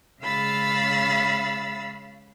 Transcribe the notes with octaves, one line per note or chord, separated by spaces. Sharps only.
C#3 G#3 F5 B5 E6 A6